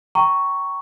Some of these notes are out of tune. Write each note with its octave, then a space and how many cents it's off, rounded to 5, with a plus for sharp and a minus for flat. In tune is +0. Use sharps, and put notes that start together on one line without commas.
G5 -20 A#5 +0 C#6 +0